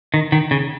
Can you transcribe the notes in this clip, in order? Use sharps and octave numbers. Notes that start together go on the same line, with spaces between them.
D#3
D#3
C#3